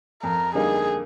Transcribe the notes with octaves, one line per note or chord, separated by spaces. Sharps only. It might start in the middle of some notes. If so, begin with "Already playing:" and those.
F2 A#4
D3 G3 A#3 D#4 G#4